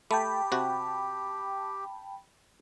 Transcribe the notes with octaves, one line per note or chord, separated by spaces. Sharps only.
A3 G4 G5 A5 B5
C3 F#4